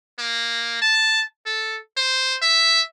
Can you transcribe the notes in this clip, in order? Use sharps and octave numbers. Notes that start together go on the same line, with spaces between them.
A#3
A5
A4
C5
E5